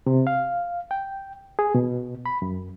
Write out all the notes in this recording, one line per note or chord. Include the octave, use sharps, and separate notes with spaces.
C3
F5
G5
G#4
B2
B5
F#2